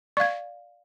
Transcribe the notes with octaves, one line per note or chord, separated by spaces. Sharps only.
D5 F5 C#6 G#6